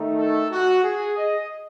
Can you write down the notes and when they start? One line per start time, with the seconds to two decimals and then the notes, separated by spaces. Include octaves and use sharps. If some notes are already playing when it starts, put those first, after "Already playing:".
Already playing: D#3 A3 D#4
0.17 A4
0.51 F#4
0.84 G#4
1.18 D#5